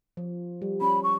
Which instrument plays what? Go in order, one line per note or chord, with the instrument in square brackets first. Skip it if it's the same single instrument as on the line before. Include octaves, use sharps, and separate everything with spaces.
[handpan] F3
G3
[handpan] C#4 [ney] B5
[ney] C#6